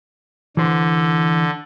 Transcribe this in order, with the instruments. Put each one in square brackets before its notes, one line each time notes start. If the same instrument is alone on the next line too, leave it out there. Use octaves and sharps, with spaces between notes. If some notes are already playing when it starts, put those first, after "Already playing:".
[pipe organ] D3 [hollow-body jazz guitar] E3 C5